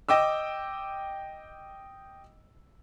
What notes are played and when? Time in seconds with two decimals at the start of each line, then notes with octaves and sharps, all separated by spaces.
0.09 D#5 G5 D6 E6